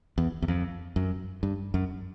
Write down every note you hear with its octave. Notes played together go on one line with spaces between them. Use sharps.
E2
E2
F2
F#2
G2
F#2